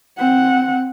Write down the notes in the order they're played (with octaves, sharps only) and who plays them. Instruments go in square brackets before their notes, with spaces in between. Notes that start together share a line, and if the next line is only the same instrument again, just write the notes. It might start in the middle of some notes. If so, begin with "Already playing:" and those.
[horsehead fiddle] C4 F#5